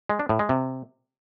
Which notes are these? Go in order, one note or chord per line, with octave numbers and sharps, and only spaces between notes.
G#3
D4
A2
G#3
C3